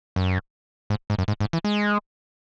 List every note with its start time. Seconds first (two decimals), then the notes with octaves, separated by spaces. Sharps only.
0.16 F#2
0.90 G#2
1.10 G#2
1.19 F#2
1.28 G#2
1.40 G#2
1.53 E3
1.64 G#3